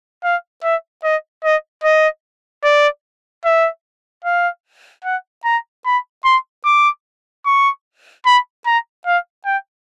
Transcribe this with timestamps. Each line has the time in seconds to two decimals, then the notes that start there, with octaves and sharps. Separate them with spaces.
0.24 F5
0.64 E5
1.04 D#5
1.44 D#5
1.84 D#5
2.64 D5
3.45 E5
4.24 F5
5.04 F#5
5.45 A#5
5.85 B5
6.24 C6
6.65 D6
7.46 C#6
8.26 B5
8.66 A#5
9.06 F5
9.45 G5